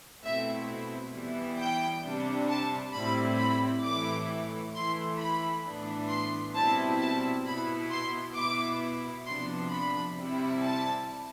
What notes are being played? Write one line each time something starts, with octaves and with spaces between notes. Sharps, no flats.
B2 A3 C4 E4 E5
E3 G3 B3 E4
G5
C3 G3 D4
A5
A2 G3 C4 E4 B5
B5
A2 E3 A3 E4 D6
E3 A3 E4 C6
B5
A2 E3 B3 D4
C6
B2 G3 C4 E4 A5
A5
B2 B3 E4 B5
C6
B2 B3 E4 D6
C3 F3 B3 D4 C6
B5
C3 G3 C4 E4
A5